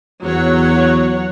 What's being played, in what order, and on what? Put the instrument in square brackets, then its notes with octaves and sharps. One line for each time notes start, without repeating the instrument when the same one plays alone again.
[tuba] E2 [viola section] F#3 C#5 F#5